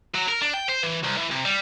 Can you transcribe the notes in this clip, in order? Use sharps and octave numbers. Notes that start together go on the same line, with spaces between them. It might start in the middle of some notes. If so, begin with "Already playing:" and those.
F#3
A#4
D4
G5
C5
E3
C2
E3
C3
G3